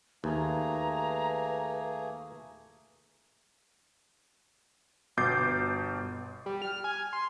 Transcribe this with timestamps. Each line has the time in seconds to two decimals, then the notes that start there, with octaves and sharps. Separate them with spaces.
0.24 D#2 A3 A#3 G#4 B4 A#5
5.17 G1 B2 D6 G6 A6 C7
6.46 G3
6.62 F6
6.84 G#5
7.13 C6